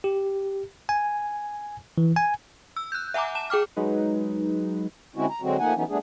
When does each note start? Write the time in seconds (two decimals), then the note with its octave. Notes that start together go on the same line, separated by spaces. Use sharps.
0.04 G4
0.89 G#5
1.98 E3
2.16 G#5
2.76 E6
2.92 F#6 G6
3.14 E5 F#5 G#5 A#5 D6
3.35 A5 E7
3.50 G#4 G5 D6 F6
3.76 F#3 G#3 D#4 B4
5.16 D3 G#3 C4 C#4 E4 F#4
5.29 A#5
5.42 D3 F#3 G#3 C4 F#4
5.59 F3 A3 A#3 D#4 F#5 G#5
5.75 E3 F#3 A3 B3 C#4 D#4
5.89 G3 A3 B3 D4 G#4